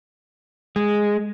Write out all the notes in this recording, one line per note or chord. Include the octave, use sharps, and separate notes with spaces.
G#3